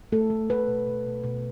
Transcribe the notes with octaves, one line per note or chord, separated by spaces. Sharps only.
A3 A4
A3
A3 B4
B2
B2
B2
B2